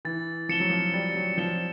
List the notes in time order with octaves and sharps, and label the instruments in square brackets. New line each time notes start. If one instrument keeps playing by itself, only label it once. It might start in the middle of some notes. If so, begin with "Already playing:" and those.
[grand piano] E3 [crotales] A6
[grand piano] F3 [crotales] C#7 E7 G7
[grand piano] F#3
F3
[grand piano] G3 [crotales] A6
[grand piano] F#3
[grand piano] F3 [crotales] C#7 E7 G7